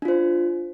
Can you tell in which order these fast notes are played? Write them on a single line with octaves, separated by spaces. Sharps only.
D4 F4 C5